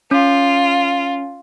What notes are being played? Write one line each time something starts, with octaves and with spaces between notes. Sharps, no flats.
C#4 F4